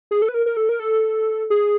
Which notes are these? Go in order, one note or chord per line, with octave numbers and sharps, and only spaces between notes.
G#4
A4
B4
A#4
A#4
A4
A#4
A4
G#4